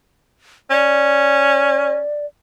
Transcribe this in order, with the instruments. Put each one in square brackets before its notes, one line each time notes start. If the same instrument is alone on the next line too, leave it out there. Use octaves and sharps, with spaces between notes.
[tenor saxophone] C#4 [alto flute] D5